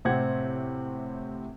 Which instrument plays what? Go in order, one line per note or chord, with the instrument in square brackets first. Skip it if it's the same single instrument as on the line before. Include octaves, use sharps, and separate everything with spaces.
[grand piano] A2 C3 C4 G4 F#5 G#6